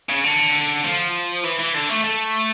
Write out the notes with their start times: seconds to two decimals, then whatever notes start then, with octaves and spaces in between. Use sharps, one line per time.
0.09 C#3
0.24 D3
0.84 F3
1.44 E3
1.59 E3
1.74 D3
1.89 A3
2.04 A3